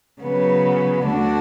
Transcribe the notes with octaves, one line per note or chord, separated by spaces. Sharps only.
C#3 F#3 B3
D2 D3 A3 D4 F#4